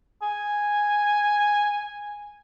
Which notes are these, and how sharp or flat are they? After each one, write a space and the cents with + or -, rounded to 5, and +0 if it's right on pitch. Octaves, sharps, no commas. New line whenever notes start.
G#5 -5